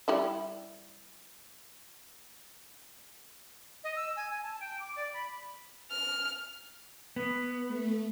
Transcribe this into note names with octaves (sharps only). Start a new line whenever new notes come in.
G3 E4 E5
D#5
E6
G#5
G#5
A5
G5
D6
D5
B5
F6
B3
A3